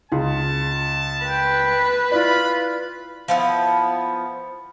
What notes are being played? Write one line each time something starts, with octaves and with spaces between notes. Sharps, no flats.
C#2 F4 G#4 A5
B4 G5
E4 F4 D5 B5
F3 B3 E4